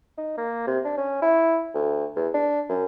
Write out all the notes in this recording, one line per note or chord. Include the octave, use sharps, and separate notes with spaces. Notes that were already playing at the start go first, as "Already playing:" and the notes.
D#4
A#3
C3
D4
C#4
E4
D2
E2
D4
F#2